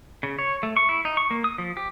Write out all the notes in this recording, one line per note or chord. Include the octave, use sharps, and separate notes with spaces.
C#3
C#5
A3
C#6
E4
D#4
C#6
A#3
D#6
F3
G4